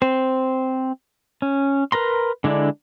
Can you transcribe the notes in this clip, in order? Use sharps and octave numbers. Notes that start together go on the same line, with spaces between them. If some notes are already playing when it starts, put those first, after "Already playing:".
C4 C5
C#4
A#4 B4 A#5 C6
D3 G#3 D4 E4